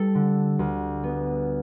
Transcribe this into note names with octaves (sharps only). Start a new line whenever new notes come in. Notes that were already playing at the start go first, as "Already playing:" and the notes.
Already playing: G3 A4
D3
D2
B3